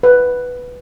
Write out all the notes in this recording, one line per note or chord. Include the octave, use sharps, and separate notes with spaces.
B4